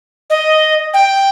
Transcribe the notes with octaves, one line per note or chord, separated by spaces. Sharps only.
D#5
G5